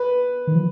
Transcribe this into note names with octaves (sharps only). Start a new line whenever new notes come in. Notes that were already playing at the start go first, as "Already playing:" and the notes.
Already playing: B4
D#3
F3